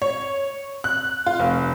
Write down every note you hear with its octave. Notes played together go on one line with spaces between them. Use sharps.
C#5
F#6
F4
F1